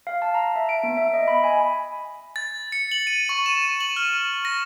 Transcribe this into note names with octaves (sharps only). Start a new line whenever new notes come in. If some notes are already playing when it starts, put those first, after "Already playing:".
F5
A5
A#5
E5
D7
B3
E5
D#5
B5
G#5
A6
C#7
F#7
D#7
C#6
E7
F#7
F6
A#6